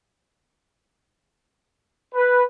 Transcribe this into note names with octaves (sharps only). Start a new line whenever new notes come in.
B4